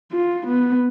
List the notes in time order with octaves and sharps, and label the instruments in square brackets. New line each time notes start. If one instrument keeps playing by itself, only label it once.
[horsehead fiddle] F4
B3